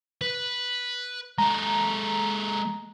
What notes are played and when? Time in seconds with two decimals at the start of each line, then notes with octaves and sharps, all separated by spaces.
0.21 B4
1.38 G#3 A4 A#5